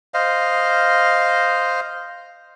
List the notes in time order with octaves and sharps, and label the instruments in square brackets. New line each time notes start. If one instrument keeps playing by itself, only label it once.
[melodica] C5 D#5 F5